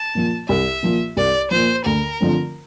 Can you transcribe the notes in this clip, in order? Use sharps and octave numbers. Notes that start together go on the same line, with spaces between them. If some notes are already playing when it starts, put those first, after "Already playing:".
Already playing: A5
A#2 F3
C2 E5
A#2 F3
C2 D5
A#2 F3 C5
D2 A#4
D3 F3 A3 C4